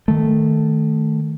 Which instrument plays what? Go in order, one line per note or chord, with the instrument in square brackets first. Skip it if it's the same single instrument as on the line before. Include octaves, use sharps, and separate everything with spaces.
[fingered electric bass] D#3 A3